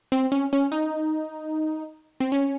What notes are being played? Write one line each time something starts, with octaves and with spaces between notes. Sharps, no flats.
C4
C#4
C#4
D#4
C4
C#4